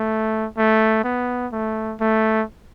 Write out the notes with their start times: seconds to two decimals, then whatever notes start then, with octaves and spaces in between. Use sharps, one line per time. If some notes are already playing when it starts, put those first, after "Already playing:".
Already playing: A3
0.57 A3
1.04 B3
1.52 A3
2.00 A3